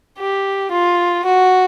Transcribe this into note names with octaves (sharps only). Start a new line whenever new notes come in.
G4
F4
F#4